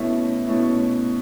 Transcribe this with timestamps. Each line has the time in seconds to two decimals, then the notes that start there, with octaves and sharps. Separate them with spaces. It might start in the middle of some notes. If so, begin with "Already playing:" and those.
Already playing: B2 A3 C#4 E4 E5
0.47 B2 A3 C#4 E4